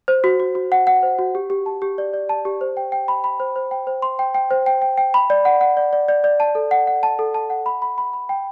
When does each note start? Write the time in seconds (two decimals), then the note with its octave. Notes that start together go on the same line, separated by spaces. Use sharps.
0.08 C5
0.24 F#4
0.40 F#4
0.55 F#4
0.72 F#5
0.87 F#5
1.03 C5
1.19 F#4
1.35 G4
1.50 G4
1.66 A5
1.82 G4
1.98 D5
2.14 D5
2.29 A5
2.45 G4
2.61 C5
2.77 G5
2.92 G5
3.08 B5
3.24 B5
3.40 C5
3.56 C5
3.71 G5
3.87 C5
4.02 C6
4.19 G5
4.34 G5
4.51 C5
4.66 G5
4.82 G5
4.97 G5
5.14 B5
5.30 D5
5.45 F#5
5.61 F#5
5.77 D5
5.93 D5
6.08 D5
6.24 D5
6.40 A5
6.55 A4
6.71 F#5
6.87 F#5
7.03 A5
7.19 A4
7.34 A5
7.50 F#5
7.66 B5
7.82 B5
7.98 B5
8.13 B5
8.29 G5